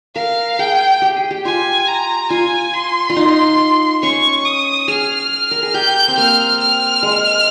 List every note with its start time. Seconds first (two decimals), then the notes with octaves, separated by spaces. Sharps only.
0.16 A#4 F5
0.59 G#4 G5
1.02 G4
1.16 G#4
1.31 G4
1.45 F4 G#5
1.88 A#5
2.30 F4 G#5
2.73 C6
3.10 F4
3.16 D#4
4.03 C#4 C#6
4.45 D#6
4.88 G#4 F6
5.51 A#4
5.63 G#4
5.74 G4 G6
6.08 C4
6.17 A#3 F6
6.60 F6
7.03 G#3